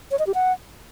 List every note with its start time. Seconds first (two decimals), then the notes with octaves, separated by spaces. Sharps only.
0.11 C#5
0.19 D#5
0.27 G4
0.34 F#5